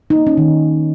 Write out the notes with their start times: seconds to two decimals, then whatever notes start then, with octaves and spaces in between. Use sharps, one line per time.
0.10 D#4
0.15 A#3
0.27 C#4
0.37 D#3